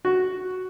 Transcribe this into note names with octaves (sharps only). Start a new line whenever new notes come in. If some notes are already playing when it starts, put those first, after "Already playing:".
F#4